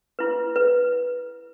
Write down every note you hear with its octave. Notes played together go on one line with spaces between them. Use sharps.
E4 B4
B4